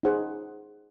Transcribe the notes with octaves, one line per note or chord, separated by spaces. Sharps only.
D#4 G#4 C5 F#5